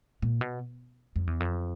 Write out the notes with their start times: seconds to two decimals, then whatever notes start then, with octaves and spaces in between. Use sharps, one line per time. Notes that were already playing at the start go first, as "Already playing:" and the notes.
0.22 A#2
0.41 B2
1.16 F2
1.27 E2
1.40 F2